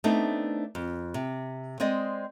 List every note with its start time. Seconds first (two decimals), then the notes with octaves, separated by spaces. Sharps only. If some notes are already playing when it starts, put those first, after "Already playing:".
0.04 A3 B3 C4 D4 D#4
0.75 F2
1.14 C3
1.80 G#3 C4 D5 D#5